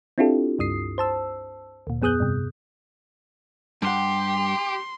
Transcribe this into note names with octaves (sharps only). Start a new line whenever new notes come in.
C4 D4 E4 F4 G4 A4
C#2 G2 D#6 C7
C5 A5 E6
D2 A#2
F2 B3 G#4 D#6 F#6 G6
G2 C3
G2 G4 F#5 C6